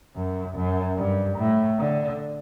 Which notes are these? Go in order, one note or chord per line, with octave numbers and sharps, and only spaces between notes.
F#2
F#2
G2
A2
D3